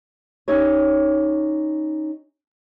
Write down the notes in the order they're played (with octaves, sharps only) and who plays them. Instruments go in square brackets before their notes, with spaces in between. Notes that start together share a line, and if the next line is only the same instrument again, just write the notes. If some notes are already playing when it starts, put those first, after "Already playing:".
[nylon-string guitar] C#4 D#4 E4 G4 C#5